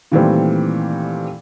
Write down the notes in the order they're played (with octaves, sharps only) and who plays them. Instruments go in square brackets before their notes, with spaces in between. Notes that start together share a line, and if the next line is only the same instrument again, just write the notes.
[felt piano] A#2 D#3 E3 G3 A3 C4